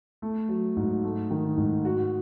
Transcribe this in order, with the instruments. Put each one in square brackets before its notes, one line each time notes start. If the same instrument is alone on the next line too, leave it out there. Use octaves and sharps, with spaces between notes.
[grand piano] A3
F#3
G#2
A3
D#3
G#2
F#4